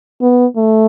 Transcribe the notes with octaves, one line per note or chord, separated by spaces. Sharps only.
B3
A3